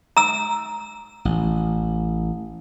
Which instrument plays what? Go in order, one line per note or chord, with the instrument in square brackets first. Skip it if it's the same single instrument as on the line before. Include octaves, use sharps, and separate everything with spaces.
[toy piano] A#5 E6
[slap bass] A1